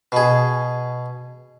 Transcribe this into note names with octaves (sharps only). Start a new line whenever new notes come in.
B2 G#4